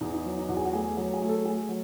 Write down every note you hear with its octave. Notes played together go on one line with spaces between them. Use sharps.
E2 D#4
D#4
F#3
D#4
E2 F#4
G#4
F#4
A3 G#4
F#3 G#4
G#4
A3
A4
A3 G#4
F#3